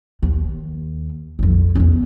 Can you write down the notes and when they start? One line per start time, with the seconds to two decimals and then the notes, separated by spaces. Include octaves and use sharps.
0.22 D#2
1.39 A#1 F2
1.75 E2 C#4